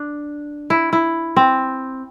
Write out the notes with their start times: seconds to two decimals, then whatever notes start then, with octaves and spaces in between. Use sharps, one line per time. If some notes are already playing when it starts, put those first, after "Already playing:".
Already playing: D4
0.70 E4
0.93 E4
1.36 C4